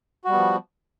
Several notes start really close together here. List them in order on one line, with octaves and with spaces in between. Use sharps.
F#4 G3 B3 F3